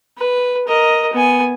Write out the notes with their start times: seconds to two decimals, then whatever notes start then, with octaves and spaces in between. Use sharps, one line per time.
0.17 B4
0.67 A#4 D#5
1.13 B3 G#5